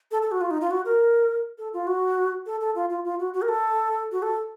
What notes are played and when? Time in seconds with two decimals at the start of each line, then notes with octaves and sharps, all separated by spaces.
0.11 A4
0.22 A4
0.31 F#4
0.41 F4
0.51 D#4
0.61 F4
0.71 F#4
0.85 A#4
1.58 A4
1.73 F4
1.87 F#4
2.46 A4
2.60 A4
2.75 F4
2.90 F4
3.05 F4
3.19 F#4
3.34 F#4
3.42 A#4
3.48 A4
4.12 F#4
4.22 A4